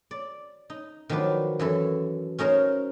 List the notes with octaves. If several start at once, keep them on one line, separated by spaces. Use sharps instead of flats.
D5
D#4
D#3 F3 F#3 D4 B4
F#2 E3 A4
C#4 D#4 A#4 C5